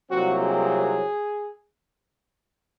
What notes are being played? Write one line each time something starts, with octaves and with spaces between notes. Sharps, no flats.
C2 A#2 F#3 C4 F#4
G#4